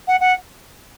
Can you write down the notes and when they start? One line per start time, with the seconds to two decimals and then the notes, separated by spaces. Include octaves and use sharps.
0.08 F#5
0.20 F#5